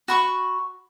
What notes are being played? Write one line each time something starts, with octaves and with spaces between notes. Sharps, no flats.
F#4 B5 C#6